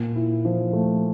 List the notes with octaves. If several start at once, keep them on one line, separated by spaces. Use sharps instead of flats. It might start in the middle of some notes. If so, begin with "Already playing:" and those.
Already playing: A#2
E4
F3
A3